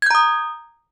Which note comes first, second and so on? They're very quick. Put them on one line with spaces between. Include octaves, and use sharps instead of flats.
G#6 G6 A#5 D#6